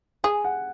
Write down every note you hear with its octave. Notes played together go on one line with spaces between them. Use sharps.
G#4 G#5
F#5